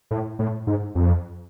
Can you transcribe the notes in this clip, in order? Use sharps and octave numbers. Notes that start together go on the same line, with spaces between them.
A2
A2
G#2
F2